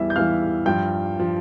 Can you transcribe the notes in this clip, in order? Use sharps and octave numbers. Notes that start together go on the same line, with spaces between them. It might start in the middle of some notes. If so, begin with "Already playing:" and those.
Already playing: E2 E3 G3 E5 E6
G6
E2 E3 G3 F5 F6
G2 F3 G5 G6
F3